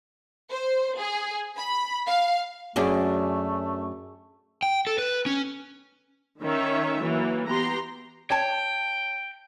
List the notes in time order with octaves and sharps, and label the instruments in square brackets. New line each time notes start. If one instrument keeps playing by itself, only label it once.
[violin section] C5
G#4
B5
F5
[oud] F#2 C#4 D4 [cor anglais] A3 [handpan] F#4 G#4
[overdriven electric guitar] G5
A4
B4
C#4
[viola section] D#3 C#4 C#5 E5
E3 F#3 A#3
B3 G4 A#5 C6
[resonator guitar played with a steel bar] C#5 A5 [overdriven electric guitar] G5